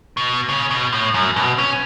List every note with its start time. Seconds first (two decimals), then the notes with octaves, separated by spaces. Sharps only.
0.17 B2
0.49 C#3
0.70 B2
0.93 A2
1.14 F#2
1.36 B2
1.58 C#4